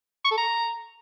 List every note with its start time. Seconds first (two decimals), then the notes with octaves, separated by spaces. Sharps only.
0.25 C#6
0.31 A4
0.38 A#5